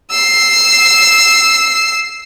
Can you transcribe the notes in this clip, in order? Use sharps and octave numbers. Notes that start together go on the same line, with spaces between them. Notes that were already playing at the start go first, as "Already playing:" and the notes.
E6 C7